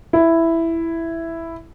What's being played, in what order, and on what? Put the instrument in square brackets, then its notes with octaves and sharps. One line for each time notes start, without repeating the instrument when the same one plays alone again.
[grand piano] E4